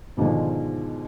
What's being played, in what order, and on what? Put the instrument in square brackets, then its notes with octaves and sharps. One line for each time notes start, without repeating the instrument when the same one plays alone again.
[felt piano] G#2 B2 D3 D#3 F3 G#3